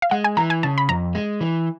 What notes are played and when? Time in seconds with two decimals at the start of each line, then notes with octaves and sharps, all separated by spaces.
0.02 F5
0.11 G#3 F#5
0.24 G#5
0.37 E3 A#5
0.50 G#5
0.63 C#3 A5
0.78 B5
0.89 F2 A#5
1.15 G#3
1.41 E3